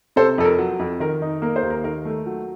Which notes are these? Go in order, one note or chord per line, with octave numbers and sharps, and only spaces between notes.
C3 A4 C5
F2 A4
A#4
F#3
F2
D#3 A#4
D#4
A#3 A#4
C5
D#2
A#4
D#3 A#4
A3
F#3